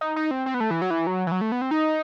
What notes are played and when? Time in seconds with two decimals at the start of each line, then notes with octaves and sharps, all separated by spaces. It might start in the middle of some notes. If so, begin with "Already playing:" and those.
0.01 D#4
0.16 D#4
0.31 C4
0.46 C4
0.54 B3
0.60 A3
0.71 E3
0.82 F#3
0.90 E3
1.07 F#3
1.27 E3
1.32 F#3
1.41 A3
1.52 B3
1.61 C4
1.71 D#4